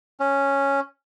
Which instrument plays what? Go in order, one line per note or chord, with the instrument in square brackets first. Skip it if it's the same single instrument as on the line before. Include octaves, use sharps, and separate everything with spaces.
[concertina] C#4